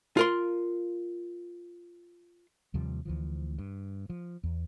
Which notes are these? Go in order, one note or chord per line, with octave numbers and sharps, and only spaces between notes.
F4 A#4 C6
D#2 C3 F3 G3
D2 E3 F3
G2
F3
E2